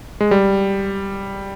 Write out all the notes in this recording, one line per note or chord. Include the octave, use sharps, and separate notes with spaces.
G#3
G3